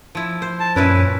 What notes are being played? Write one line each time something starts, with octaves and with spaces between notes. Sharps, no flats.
F3 E4
C5
A5
F#2 A#2 C#4 E4 A#4 B4